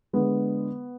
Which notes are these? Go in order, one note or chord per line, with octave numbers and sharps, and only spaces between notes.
D3 G#3 B3